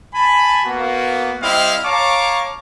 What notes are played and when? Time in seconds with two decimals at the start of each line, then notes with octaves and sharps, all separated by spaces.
0.15 G#5 A5 B5
0.66 A#3 B3 F#4
1.43 G3 C4 E4 D#5 F5
1.85 C#5 F5 A5 A#5 C#6 D6